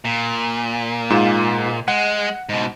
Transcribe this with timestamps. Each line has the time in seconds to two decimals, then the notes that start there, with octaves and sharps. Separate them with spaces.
0.05 A#2
1.10 G#2 F4 E7
1.88 G#3 F#5
2.49 G#2 B2